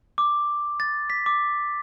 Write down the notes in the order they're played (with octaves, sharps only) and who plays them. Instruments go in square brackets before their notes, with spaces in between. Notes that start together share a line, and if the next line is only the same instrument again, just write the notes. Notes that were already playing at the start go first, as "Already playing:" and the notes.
[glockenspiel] D6
A6
B6
D6